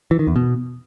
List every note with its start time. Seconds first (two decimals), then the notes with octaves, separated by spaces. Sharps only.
0.11 E3
0.19 D#3
0.27 E2
0.36 B2